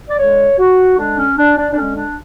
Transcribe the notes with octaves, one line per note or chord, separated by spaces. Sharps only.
D5
D3 G#3 C#5
F#4
D3 G#3 D4
C#4
D4
D4
D4
D3 G#3 C#4
D4